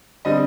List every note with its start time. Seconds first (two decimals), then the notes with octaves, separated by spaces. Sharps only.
0.25 D3 G3 C4 D#5